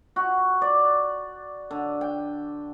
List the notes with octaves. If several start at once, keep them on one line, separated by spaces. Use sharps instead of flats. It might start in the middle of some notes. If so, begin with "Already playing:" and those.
F#4
D5
D3
G5